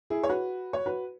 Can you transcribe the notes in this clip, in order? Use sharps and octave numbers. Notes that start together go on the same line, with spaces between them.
E4 G#4
C#5
F#4 B4
C#5
F#4 B4